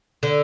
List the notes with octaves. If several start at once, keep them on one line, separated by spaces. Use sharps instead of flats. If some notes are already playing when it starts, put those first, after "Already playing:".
D3